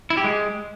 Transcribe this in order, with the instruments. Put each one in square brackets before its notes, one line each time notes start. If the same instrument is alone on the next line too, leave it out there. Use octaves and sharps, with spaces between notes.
[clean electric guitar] E4
G4
G#3